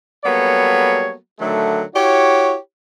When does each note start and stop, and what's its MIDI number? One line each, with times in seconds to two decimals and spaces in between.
0.25 1.16 54
0.25 1.16 55
0.25 1.16 58
0.25 1.16 59
0.25 1.16 69
0.25 1.16 73
1.39 1.84 50
1.39 1.84 51
1.39 1.84 54
1.39 1.84 57
1.96 2.57 64
1.96 2.57 66
1.96 2.57 67
1.96 2.57 73